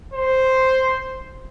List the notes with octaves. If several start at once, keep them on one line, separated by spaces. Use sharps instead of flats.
C5